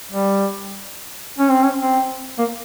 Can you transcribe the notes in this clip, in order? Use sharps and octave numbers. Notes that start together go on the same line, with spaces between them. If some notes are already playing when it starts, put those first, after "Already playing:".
G3
C#4
C4
C#4
C4
A#3